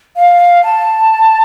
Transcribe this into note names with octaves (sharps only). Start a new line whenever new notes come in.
F5
A5